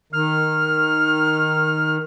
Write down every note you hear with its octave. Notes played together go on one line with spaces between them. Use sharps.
D#3 F6